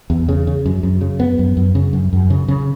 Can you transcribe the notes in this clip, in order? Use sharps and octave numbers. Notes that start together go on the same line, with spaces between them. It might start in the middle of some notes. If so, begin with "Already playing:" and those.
E2
C#3
C#3
F#2
F#2
C#3
F#2 B3
F#2
F#2
C#3
F#2
F#2
C#3
C#3